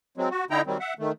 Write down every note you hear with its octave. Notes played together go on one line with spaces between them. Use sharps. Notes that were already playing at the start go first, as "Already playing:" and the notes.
F#3 G#3 C4
F#4
D3 D#4 E4 G5 A#5
D#3 F#3 G3 C4
E5 F#5
D#3 A3